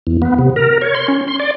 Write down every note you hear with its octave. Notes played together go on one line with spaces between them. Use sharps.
E2
B3
C3
A#4
C#5
C6
C#4
C6
D5